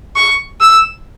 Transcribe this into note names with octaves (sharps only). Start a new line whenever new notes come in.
C#6
E6